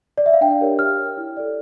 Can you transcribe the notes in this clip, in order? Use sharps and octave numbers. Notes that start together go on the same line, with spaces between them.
D5
E5
F5
D4 G5
G4 A#4 C#5
G4 F6
C#5
E4
A4 D5